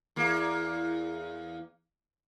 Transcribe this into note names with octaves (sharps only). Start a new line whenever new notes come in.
E2 A#3